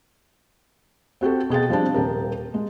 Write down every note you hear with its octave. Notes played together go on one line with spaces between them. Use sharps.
C4 F#4 G4 A4
B2 G#4 G5 A6
F3 G3 C4 D4
D#1 G4 A#4
G#3